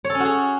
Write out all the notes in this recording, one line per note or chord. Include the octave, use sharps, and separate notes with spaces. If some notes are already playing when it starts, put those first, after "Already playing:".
C#5
A4
C#4
F#4
G#4